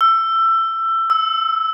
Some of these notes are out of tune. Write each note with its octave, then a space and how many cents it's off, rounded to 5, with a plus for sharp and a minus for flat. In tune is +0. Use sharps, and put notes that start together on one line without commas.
E6 +20
E6 -15